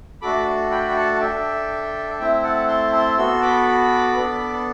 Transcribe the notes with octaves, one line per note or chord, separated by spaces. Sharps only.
A3 D4 F#4 A4 B5 D6
G5 B5
G5
F#5 A5
A5
D4 A4 E5 G5
A3 C4 E4 E5 G5
F#5 A5
A5 C6
A5 C6
B3 F#4 A4 C6 E6
B5 D6
B3 D4 A4